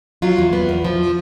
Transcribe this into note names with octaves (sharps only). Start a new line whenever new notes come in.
F#3 F4
E2
B3
E2
F3